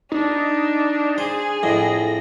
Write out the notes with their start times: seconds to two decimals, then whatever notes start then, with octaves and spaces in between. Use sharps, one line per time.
0.12 D4 D#4
1.18 G#4 C5 G#5
1.63 F2 A2 A#6